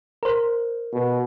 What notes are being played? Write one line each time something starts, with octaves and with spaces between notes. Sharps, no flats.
A#4 C5
B2